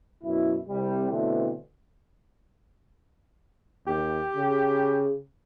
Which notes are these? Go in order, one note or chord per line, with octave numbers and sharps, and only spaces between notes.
F#2 B2 E4
C2 C3 G3
B2 D3 E3 A3 C4
D#2 G4
C#3